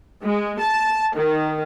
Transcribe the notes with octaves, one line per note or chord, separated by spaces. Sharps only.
G#3
A5
D#3